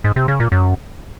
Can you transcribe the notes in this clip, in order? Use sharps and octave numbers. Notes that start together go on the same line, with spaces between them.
G#2
C3
C#3
A#2
F#2